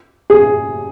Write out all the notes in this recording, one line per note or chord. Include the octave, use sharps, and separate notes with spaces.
G#4